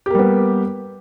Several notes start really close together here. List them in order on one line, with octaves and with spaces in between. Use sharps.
G4 A#3 G3 B3